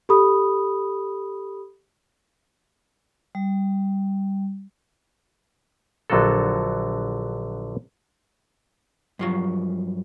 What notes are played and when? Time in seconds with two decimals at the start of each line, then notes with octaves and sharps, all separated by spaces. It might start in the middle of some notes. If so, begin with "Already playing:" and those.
0.09 G4 A4 B5 D#6
3.35 G3
6.10 A#1 D3 F#3 F4 F#4 A4
9.19 G2 F3 F#3